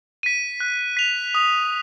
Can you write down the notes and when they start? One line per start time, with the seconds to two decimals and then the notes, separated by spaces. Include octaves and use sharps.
0.23 B6 D#7
0.60 F#6
0.97 B6 F7
1.35 D#6